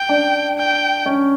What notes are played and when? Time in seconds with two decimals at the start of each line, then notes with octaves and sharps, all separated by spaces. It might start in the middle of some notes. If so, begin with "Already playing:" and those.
Already playing: G5
0.09 D4
0.58 G5
1.06 C#4